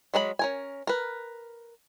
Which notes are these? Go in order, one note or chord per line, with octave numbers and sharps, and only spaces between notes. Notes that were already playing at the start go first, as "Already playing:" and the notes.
F#3 G#3 A#4 B5
C#4 A#4 G#5
A#4 B4